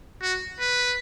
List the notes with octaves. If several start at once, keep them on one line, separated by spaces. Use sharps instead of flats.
F#4
B4